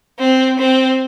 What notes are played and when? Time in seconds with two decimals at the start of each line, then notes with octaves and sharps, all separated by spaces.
0.19 C4
0.59 C4